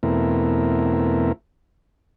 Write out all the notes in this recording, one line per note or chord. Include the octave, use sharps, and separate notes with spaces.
E2 B2 A3 C4 E4 A#4